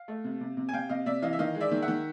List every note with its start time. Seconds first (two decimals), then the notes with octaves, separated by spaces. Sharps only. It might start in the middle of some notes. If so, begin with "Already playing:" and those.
Already playing: F5
0.08 A3
0.24 C3
0.41 C3
0.57 C3
0.69 G#5
0.73 C3 F5 G5
0.89 C3 D#5 F5
1.06 C3 D5 E5
1.22 E3 D#5 F5
1.33 E5
1.39 D#3 D#5 F5
1.55 G#3
1.60 D5 E5
1.71 D#3
1.82 E5 F#5
1.88 D#3